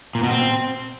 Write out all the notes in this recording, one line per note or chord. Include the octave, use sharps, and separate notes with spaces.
A#2
B2
C4